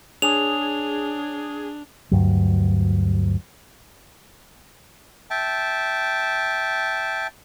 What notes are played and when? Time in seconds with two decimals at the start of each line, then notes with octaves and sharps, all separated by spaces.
0.22 D4 G#4 C#5 G#5 D#6 F7
2.11 D2 G2 F#3
5.30 E5 G5 A5